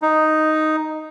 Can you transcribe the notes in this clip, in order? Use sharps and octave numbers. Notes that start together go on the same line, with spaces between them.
D#4